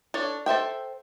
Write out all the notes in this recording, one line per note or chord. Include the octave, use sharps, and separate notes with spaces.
D4 A4 C#5
A4 C5 E5 G5